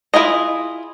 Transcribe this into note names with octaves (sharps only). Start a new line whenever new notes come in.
E4 F4 G#4 D#5